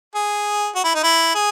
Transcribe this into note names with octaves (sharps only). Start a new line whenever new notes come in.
G#4
F#4
E4
D#4
E4
G#4